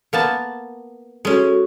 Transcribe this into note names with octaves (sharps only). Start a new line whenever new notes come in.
A#3 B3 A5
G#3 C#4 F#4 A4